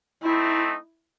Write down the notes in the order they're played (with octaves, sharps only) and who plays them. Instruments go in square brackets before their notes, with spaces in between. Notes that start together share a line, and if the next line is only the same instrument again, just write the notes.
[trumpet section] A3 C4 D#4 [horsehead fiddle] E4